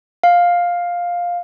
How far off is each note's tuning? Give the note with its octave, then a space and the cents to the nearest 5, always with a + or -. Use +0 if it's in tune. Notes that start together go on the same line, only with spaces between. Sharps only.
F5 +10